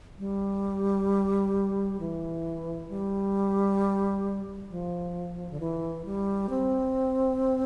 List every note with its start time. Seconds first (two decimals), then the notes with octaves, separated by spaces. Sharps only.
0.19 G3
2.00 E3
2.89 G3
4.70 F3
5.50 D3
5.60 E3
6.05 G3
6.50 C4